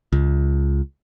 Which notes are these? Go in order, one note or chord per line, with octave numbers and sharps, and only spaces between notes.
C#2